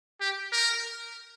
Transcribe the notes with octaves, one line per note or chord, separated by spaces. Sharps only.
G4
A#4